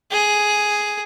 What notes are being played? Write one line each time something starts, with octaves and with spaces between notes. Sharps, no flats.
G#4